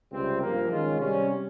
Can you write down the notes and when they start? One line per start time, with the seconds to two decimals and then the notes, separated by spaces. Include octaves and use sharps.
0.11 C#2 C3 G3 C4
0.40 G2 F3 A#3
0.70 D#3 G#3 C#4 F4
0.99 C3 G3 C#4